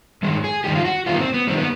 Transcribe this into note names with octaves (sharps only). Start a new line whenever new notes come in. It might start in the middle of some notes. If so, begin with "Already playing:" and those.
G2 D#3 G#3
G#4
G2 D#3 G#3 G4
F4
F#4
F#2 D#3 G3 F4
B3
C4
B3
F#2 D#3 G3 C4
B3